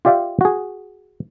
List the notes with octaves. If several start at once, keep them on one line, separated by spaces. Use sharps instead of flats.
F4 G4 D5 E5 F5 G5
F#4 G#4